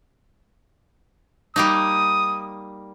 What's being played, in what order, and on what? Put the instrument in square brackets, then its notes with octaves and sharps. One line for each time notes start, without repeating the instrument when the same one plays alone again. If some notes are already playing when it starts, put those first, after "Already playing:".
[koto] G3 A#3 D#4 [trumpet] D#6